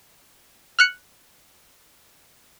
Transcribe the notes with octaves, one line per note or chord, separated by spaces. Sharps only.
F6 F#6 C#7